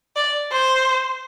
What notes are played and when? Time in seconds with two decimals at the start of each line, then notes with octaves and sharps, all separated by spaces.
0.16 D5
0.51 C5